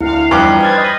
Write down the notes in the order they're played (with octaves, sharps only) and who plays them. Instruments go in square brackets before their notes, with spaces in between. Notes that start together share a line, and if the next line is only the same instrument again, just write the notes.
[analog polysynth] D2 F5 [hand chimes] E4
[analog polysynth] E2 F3 D#4 [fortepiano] G2 D6 [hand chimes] B4 G5 B5
[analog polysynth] G#4 C5 G#6 [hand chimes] F6 A6
[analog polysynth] C5 D#5 B5